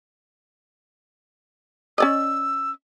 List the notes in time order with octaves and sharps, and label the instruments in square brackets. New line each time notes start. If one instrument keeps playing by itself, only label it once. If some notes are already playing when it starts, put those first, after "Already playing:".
[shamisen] C#4 D5 D#5 [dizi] E6